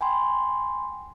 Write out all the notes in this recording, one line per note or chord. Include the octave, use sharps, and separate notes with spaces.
G5 G#5 B5 C6